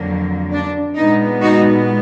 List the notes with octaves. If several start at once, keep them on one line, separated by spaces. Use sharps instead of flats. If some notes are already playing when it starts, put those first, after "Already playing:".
Already playing: F2 D3 F#3 A#3
D4
A#2 G#3 B3 D#4
D#4 F#4